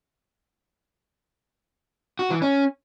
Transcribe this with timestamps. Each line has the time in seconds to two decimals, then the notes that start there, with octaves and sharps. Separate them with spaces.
2.19 F#4
2.30 E3
2.42 C#4